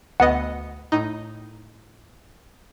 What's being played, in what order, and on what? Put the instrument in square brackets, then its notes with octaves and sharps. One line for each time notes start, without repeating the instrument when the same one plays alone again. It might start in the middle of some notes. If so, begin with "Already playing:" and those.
[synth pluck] D2 B3 D#5 [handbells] F#5
[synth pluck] A2 D#4